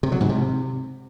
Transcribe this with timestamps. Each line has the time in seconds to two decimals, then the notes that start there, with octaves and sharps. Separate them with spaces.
0.03 C3
0.12 F#3
0.21 G#2
0.29 C3